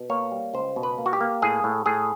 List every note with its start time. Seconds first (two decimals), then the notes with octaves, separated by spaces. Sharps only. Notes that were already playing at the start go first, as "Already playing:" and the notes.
Already playing: B2
0.10 A#3 C#5
0.32 G3
0.54 C#2 C5
0.76 B2
0.83 B4
0.98 A#3
1.06 F#4
1.13 G4
1.21 A#3
1.42 A2 G#4
1.64 A2
1.86 A2 G#4